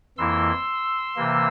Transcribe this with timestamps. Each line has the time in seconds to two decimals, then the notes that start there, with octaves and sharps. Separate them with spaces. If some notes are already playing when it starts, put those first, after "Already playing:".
0.18 F2 E3 A#3 E4 C6 E6
1.16 C3 E3 A#3